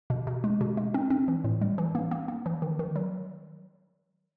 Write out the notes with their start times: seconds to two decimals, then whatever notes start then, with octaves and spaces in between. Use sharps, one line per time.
0.10 B2
0.27 B2
0.44 G#3
0.61 B2
0.77 G#3
0.94 C4
1.10 C4
1.28 E3
1.44 A2
1.61 G3
1.78 E3
1.95 A#3
2.11 A#3
2.28 A#3
2.46 E3
2.62 D#3
2.79 D#3
2.96 F#3